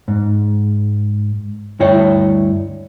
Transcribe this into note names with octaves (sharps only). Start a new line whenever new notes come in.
G#2
D2 G2 E4 C#5 G5